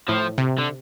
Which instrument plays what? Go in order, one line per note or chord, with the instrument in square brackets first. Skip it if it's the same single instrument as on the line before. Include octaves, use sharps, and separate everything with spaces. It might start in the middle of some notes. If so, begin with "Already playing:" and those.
[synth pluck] A2 [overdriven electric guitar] F3
[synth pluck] C3
[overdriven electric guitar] D3